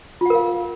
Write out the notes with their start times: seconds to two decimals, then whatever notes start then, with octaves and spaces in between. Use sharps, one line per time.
0.21 F4
0.26 F#5
0.30 A#4
0.35 F5